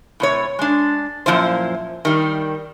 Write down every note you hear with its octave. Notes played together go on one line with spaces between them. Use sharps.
A2 C3 C#5
G#3 D4
F#2 A#2 F3 E4 C5
D#3 G3